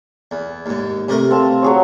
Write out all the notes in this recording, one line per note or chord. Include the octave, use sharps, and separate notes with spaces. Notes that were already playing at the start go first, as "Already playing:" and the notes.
E2
D#2 G#2
C3 A3 A#4
C4 F5 A5
F#3 G#4 C#5